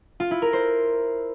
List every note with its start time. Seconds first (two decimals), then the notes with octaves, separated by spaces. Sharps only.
0.20 F4
0.31 E4
0.42 A#4
0.53 C5